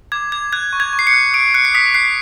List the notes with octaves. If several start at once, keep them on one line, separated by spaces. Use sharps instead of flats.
D6 G#6
D6 G#6
F#6 G#6
C#6
G#6
C#6
C7
C#7
F#6
D#6 D7
F#6 C#7
C7
D#6 B6
F#6 C7